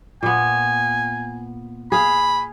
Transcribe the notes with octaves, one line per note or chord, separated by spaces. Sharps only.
A#2 B3 G#5
G#4 F5 B5